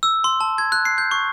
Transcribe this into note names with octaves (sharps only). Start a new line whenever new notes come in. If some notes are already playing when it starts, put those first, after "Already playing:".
E6
C6
A5
G#6
F#6
C7
G6
C#6